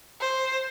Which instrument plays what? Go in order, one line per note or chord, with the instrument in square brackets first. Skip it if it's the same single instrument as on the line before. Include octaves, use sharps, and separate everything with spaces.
[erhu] C5